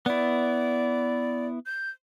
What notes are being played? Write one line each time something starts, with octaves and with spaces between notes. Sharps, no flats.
B3 E4 D5
G6